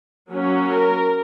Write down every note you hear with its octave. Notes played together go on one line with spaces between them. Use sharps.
F#3 A#3 C#4
A#4